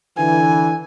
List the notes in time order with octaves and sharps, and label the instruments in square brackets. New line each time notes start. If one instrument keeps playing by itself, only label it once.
[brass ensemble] D3 E3 [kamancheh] G#5